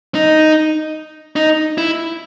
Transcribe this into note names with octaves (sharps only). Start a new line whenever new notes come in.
D#4
D#4
E4